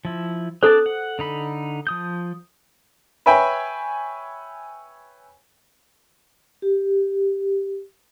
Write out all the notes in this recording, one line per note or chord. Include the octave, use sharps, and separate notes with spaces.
F3 E4
C4 D4 A4 C5 D5
F#5
D3 D#4 B5
F3 D#6 G6
B4 C#5 E5 G5 G#5 B5
G4